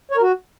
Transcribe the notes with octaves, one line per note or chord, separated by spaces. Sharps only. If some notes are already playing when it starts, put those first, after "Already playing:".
C#5
A#4
F#4